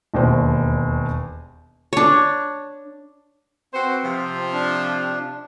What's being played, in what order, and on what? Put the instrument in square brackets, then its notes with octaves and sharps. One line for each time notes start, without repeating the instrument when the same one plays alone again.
[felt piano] E1 D#2 D4 C5
[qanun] D4 C#5
[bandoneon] C4 [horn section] F#4 B4 C5
[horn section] C3 F3
[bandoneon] D4